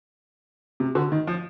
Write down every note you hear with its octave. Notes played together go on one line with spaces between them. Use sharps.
C3
D3
D#3
F3